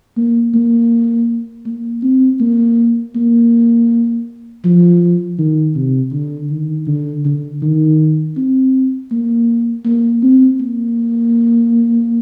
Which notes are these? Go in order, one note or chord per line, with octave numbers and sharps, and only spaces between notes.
A#3
A#3
A#3
C4
A#3
A#3
F3
D#3
C3
D3
D#3
D3
D3
D#3
C4
A#3
A#3
C4
A#3